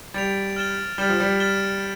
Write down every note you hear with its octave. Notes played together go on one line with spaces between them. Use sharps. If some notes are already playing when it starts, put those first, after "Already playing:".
G3 A6 D7 F7
F6 A6 E7 G7
G3 F6 A6 E7 G7
F3
G3
F6 A6 E7 G7